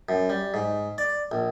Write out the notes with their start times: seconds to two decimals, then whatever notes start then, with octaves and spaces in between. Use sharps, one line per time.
0.09 F#2
0.30 G3
0.54 G#2
0.98 D5
1.32 A#1